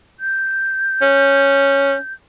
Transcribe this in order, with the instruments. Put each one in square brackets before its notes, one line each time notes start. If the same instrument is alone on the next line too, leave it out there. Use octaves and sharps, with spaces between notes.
[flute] G6
[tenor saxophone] C#4